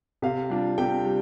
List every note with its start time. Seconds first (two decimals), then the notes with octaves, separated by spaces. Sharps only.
0.22 C3 F5
0.50 G3 D4 F4
0.78 C3 G5
1.05 G3